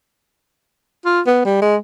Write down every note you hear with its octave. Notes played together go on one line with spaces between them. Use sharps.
F4
B3
G3
G#3